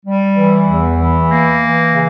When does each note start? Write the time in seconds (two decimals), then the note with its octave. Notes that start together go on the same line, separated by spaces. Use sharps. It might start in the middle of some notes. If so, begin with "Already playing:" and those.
0.05 G3
0.36 E3
0.67 E2
0.98 E3
1.29 A#3
1.60 E3
1.92 C#3